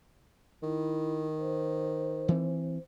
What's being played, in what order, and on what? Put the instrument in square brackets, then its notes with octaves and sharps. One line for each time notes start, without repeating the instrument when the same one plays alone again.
[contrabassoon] D#3 [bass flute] E4
[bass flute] C5
[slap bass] E3 C4